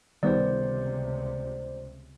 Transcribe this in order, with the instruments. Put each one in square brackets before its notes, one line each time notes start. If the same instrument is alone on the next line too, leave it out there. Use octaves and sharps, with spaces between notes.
[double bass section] C#2 C3 [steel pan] D#3 G3 B3 [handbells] C5 D5